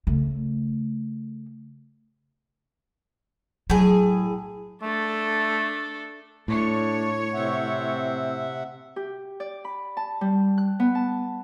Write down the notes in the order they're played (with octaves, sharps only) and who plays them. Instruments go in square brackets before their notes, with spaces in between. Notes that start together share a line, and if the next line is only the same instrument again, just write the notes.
[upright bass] C#3 A3
[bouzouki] A2 G#4 [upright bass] F#3
[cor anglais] A3 [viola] D4 A4
[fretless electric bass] A2 [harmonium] A3 [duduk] D4 [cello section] C#5
[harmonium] C3 E5 F#5 [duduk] C4
[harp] G4
D5
B5
A5
G3
F#6
B3
A5